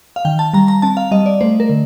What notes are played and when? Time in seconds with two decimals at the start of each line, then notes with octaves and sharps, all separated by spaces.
0.16 F5
0.25 D#3 G5
0.39 A5
0.53 G3 A#5
0.68 A#5
0.82 C4 A5
0.97 F5
1.11 G3 D#5
1.26 D5
1.41 A3 C5
1.60 A#4
1.69 D3